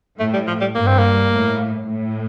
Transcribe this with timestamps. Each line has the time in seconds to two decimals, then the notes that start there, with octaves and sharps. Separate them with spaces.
0.19 A2 A3
0.34 G3
0.48 F3
0.61 G3
0.75 G2 A#3
0.87 C4
0.99 A#3
1.31 A2
1.85 A2